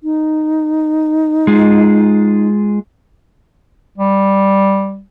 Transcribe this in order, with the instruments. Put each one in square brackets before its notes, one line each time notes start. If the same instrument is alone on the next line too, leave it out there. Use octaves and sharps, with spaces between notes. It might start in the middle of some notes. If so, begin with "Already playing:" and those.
[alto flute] D#4
[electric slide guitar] G#3 F4 G#4
[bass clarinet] G3